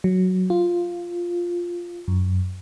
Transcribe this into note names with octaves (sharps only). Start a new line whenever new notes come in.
F#3
F4
F#2